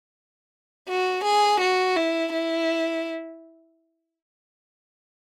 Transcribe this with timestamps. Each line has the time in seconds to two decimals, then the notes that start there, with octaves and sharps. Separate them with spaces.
0.89 F#4
1.25 G#4
1.61 F#4
1.96 E4
2.33 E4